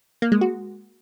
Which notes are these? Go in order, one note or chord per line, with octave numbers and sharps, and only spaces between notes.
A#3
G#3
F#4